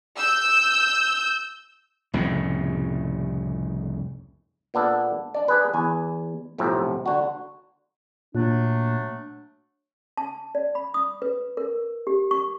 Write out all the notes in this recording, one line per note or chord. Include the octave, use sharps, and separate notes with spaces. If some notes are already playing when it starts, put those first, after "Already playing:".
E6 G6
C2 F2 A2 C#3
A#2 B3 D4 A4
D4 D5
D4 G#4 B4
E2 G#5
B1 F2 A2 C3
D3 F#4
A#2 F#3 A3 D4
A5
D5
B5
D#6
B4
A#4
G4
C#6